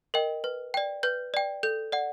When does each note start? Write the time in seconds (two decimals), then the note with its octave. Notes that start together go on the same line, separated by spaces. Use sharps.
0.14 A#4 D#5 G5
0.44 B4
0.74 D5 G5
1.03 B4 G6
1.34 D5 G5
1.63 A4 G6
1.92 D5 F#5